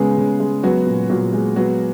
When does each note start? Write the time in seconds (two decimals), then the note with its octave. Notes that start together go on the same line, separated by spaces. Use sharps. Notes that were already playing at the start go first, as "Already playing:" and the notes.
Already playing: C#3 G#3 B3 G#4
0.17 C#3
0.40 G#3
0.63 F#3 B3 F#4
0.86 A#2
1.09 A#2 F#3 F#4
1.33 G#3
1.56 F#3 B3 F#4